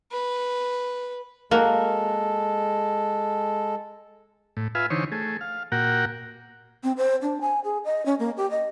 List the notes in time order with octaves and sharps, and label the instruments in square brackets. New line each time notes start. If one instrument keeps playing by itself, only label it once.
[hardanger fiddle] B4
[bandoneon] G#3 A4 [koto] A#3 F#4
[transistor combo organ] A2
F4 B4 E5 F5 G#5
D3 E3 D#4 C5 C#5
A3 G#4
F5
A#2 F#4 A#4 F#5 G5
[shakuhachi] C4
C5
D4
G#5
G#4
D#5
C#4
A#3
G4
D#5